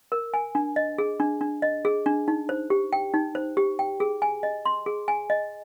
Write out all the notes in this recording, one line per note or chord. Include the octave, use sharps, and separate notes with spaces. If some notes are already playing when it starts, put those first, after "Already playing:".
A#4
G#5
D4
D#5
G#4
D4
D4
D#5
G#4
D4
D#4
C5
G4
G5
D#4
C5
G4
G5
G#4
G#5
D#5
C6
G#4
G#5
D#5